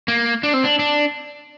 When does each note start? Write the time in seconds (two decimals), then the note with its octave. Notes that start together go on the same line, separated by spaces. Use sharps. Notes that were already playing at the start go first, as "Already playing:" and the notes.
0.08 A#3
0.43 D4
0.54 C4
0.64 D4
0.79 D4